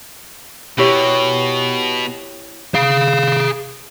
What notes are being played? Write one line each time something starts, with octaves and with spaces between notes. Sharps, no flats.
B2 E4 G4 C#5
G#4 F5